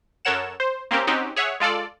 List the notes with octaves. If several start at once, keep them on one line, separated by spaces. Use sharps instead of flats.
F#2 A4 A#4 C#5 F#5 E7
C5
A#3 C4 C#4 G4 A#4
C4 C#4 D#4 F#4 G4
G#4 C#5 E5 F#5
G#3 F4 A4 D5